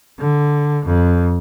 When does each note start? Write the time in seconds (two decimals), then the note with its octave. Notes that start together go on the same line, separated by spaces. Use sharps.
0.19 D3
0.86 F2